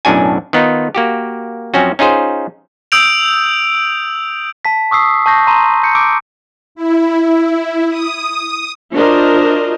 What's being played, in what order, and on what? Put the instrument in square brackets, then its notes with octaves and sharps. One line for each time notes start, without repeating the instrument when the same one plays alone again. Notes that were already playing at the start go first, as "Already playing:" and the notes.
[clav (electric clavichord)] B1 F#2 A2 D4 F#4 G#5
D#3 B3 D#4 F4
A#3 F#4 G4
F#2 F3 C4 C#4 F#4
C#4 D#4 F4 G#4 C5
[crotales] D#6 E6 G6 D7 F7
[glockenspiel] A5 B6
C#6 D#6 E6 C7
A5 C#6 G6 A#6 C7
A#5 C6 D#7
G6 C#7
D6 E6 G6 D7
[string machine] E4
D#6
[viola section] D4 F4 F#4 A#4 C5 D#5